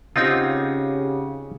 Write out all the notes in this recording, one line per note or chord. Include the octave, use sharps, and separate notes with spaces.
C#3 C4 D#4 F4 G4 F#5 D#6